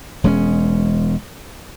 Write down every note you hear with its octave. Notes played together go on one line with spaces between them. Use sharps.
E1 G#3 A3 C#4